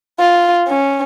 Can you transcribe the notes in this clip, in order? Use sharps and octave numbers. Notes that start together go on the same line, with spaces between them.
F4
C#4